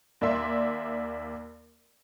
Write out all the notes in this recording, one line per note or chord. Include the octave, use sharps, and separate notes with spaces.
D#2 D5 E5 C6